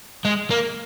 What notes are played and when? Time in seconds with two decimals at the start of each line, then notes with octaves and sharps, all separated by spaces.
0.25 G#3
0.51 A#3